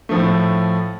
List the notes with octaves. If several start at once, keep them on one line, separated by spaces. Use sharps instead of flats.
A2 F3 A3